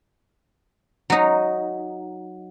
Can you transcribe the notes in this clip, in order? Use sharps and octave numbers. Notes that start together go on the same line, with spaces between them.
F#3 D#4